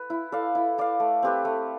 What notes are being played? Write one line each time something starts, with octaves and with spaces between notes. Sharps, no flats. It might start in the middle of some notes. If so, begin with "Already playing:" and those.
Already playing: B4
E4
A4 D5 F5
E4
A4 D5 F5
A3
C4 G4 B4
A3